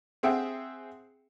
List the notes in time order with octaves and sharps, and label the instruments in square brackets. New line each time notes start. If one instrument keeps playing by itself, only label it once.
[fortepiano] C4 G#4 E5 F#5 G5